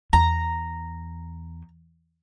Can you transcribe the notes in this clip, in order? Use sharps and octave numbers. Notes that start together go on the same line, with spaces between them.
E2 A#5